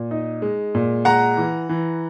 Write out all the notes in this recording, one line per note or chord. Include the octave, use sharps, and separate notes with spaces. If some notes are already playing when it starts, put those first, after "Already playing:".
Already playing: A#2
D#4
G#3
A#2
G#3 F#5 A#5
E3
E3